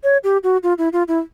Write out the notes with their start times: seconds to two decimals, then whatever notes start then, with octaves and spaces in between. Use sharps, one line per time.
0.04 C#5
0.24 G4
0.43 F#4
0.63 F4
0.78 E4
0.93 F4
1.08 E4